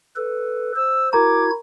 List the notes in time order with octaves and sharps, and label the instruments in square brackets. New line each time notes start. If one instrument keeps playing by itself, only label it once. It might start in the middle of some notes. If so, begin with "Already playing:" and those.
[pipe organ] A4 B4
[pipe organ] C5 [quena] E6
[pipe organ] E4 F#4 G#6 [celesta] A#4 A#5 [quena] D6